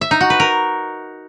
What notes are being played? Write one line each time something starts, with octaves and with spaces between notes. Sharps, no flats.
E5
D#4
F#4
B4
A#4